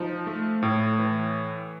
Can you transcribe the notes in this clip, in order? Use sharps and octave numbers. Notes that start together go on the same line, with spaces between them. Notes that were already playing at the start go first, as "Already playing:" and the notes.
Already playing: F3 D#4
A3
A2
E3